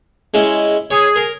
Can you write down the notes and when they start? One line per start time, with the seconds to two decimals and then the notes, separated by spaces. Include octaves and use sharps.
0.34 G#3 C#4 E4
0.91 G#4 C#5
1.16 A#4